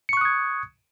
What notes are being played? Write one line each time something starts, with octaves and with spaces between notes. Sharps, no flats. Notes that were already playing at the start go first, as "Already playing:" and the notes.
C#6 D#6 F#6 G#6 C#7